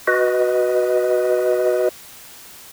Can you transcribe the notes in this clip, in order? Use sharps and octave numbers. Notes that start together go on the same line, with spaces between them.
F#4 B4 D#5